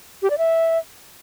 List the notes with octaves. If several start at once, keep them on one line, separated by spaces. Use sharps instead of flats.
G4
D5
E5